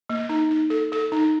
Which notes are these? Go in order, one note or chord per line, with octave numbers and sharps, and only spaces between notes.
A#3
D#4
D#4
A4
A4
D#4